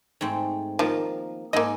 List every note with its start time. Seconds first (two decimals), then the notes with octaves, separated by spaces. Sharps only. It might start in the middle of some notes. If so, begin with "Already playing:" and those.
0.21 G#2 A3 C4
0.79 D#3 F3 A#3
1.53 G#2 A#3 A4 D#5